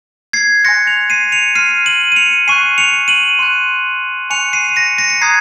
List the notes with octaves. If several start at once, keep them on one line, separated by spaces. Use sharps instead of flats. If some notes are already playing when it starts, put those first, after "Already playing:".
G#6 C7
G#5 C6 F#6 A#6 C#7
C#7 F7
C7 D#7
C#7 F7
C6 F6 C7 D#7
D#7 F#7
D#7
C#7 F7
G#5 C#6 F#6 C7 D#7
C#7 F7
D#7 F#7
C6 F#6
G#5 C#6 F#6 C#7 F7
C7 D#7
D#7
A#6 C#7
A#6 C#7
A#6
A#5 D#6 F#6 G#6 C7